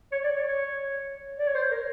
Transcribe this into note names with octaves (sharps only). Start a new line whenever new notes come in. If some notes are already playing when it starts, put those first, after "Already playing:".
C#5
D5
C#5
C#5
D5
C#5
C5
A#4